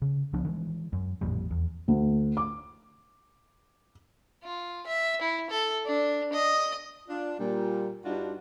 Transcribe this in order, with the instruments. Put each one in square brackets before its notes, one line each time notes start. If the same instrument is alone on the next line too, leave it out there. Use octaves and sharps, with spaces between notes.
[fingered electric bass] C#3
C#2 F3 B3 D4
D#3 E3 G#3
F#2
A1 F2 A#2 G3
E2
[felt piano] D2
D6
[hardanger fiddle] F4
E5
E4
A4
D4
D#5
[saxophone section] D4 F4
A#2 G3
G2 G3 D4 D#4 F4 F#4